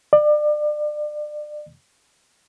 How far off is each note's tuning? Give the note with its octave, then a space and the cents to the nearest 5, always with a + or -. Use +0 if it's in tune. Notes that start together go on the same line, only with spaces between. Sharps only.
D5 +30